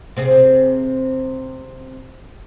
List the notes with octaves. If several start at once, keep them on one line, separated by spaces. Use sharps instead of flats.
C3 C4 G#4